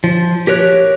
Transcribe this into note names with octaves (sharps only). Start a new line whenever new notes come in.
F3
G4 A#4 C#5 F#6